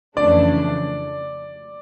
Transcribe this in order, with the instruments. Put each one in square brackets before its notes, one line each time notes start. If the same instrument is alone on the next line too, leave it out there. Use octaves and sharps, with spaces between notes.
[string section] F2 C#3 E3 A3 D4 [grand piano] D5